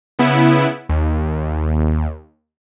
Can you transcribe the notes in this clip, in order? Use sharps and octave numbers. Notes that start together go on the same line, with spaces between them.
C#3 B3 E4
D#2